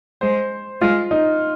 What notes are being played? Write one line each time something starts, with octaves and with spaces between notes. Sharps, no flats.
G#3 C5
G#3 F4
D#4